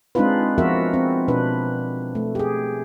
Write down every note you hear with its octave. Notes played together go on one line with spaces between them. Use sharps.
G#3 C4 D4 D#4 F4 B4
F3 B3 F4 F#4 A#4 E5
C4
B2 D4 B4
A3
G4 G#4